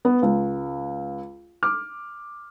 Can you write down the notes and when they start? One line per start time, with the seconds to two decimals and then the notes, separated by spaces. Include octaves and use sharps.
0.05 B3
0.22 C#2
1.63 D6 F6